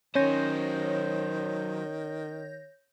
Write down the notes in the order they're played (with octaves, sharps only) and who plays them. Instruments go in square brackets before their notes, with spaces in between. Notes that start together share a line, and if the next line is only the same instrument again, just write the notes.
[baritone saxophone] D#3 [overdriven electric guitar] F#3 C5 [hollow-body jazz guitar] C#4 [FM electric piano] C#5 G6 A#6